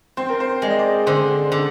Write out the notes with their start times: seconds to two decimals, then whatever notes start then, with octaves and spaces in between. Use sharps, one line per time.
0.17 C4 C5
0.29 A#4
0.40 C5
0.62 G#3 D5
0.70 D#5
0.79 D5
1.06 D3 C5
1.52 D3